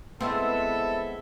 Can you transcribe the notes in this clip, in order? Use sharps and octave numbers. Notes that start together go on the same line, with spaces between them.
G#3 B3 C4 E4 A4 E5